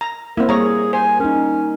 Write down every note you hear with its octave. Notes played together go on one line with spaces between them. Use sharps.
A#5
A#3 C4 E4 A#4
G3 G#4 C#5 A#5
C5 G#5
C#4 D#4 A#4